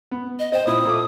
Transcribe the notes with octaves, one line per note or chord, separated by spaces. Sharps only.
B3
D#5
C5 D#5 G5
A#2 E4 D#6
A#2 A4 D6